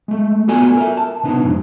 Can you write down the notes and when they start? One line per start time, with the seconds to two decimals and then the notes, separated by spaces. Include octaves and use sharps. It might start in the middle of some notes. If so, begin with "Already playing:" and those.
0.08 G#3 A3
0.48 B3 F4 F#4 A4 D5 G#5
0.77 A#4 E5
0.97 A5
1.23 C3 B3 D4 D#4
1.43 F2 G#2